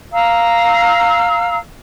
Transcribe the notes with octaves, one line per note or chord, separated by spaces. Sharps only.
F5 A#5 E6